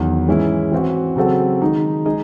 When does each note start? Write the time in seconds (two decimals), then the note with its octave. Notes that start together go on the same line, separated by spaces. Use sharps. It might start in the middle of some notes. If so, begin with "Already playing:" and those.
Already playing: E2 D#3 F#3
0.28 G#2 E3 G#3 C#4 E4
0.72 E3 C4 F#4
1.16 C#3 F#3 C4 F#4 A4
1.61 D#3 G#3 D#4
2.06 G#3 D#4 G#4 D#5